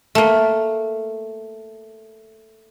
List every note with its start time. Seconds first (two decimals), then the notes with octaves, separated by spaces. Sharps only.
0.15 A3 A#3